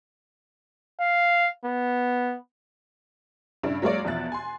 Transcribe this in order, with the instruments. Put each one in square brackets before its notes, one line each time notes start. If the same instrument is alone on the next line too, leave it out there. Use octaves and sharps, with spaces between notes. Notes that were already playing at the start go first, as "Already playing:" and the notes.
[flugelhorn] F5
B3
[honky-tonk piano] G2 C#3 D4 E4
F#3 G#3 A#3 C#5 D5
E2 B2 F3 E5 F#6 A6
G#5 C6